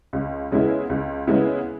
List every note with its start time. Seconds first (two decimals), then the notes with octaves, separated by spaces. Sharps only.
0.13 C#2
0.52 C#3 G#3 B3 E4
0.90 C#2
1.27 C#3 G#3 B3 E4